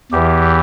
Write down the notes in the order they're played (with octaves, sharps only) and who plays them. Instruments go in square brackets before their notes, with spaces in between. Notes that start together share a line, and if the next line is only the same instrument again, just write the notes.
[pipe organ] E2 E3 G4